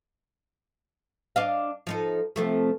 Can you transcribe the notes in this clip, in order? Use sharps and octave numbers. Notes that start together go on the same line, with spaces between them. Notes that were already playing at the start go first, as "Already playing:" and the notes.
D4 D#5 F5
F3 D#4 A4
C3 F3 A3